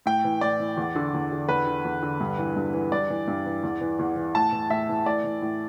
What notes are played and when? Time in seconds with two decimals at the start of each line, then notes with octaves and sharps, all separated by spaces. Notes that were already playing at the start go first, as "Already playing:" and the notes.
0.06 A2 G5
0.24 E3
0.41 A2 D5
0.60 E3
0.77 E2
0.96 D3
1.14 E2
1.32 D3
1.49 E2 B4
1.67 D3
1.85 E2
2.03 D3
2.20 G2
2.38 E3
2.56 G2
2.74 E3
2.92 G2 D5
3.10 E3
3.28 G2
3.46 E3
3.63 E2
3.81 E3
3.99 E2
4.16 E3
4.35 A2 A5
4.52 E3
4.70 A2 E5
4.89 E3
5.06 A2 D5
5.24 E3
5.42 A2